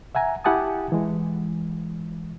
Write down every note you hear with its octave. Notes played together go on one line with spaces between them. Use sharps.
E5 F#5 G#5 A#5
E4 G4 F#5 G#5 A5 D#6
E3 G#3